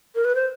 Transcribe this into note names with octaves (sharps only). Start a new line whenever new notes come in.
A#4
B4
C5